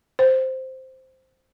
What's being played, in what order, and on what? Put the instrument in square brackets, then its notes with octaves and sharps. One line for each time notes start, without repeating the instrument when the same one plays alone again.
[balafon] C5